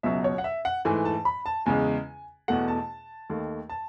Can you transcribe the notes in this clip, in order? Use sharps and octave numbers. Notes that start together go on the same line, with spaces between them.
C#2 B2 F#3 E5
C#5
F#5
E5
F#5
G#2 E3 A3 G#5
A5
B5
A5
E2 C#3 G#3 G#5
E2 B2 A3 F#5
A5
D#2 D#3 A3
A5